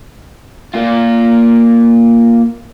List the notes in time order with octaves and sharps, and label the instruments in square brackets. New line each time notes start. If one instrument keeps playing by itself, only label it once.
[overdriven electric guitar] A#3 F4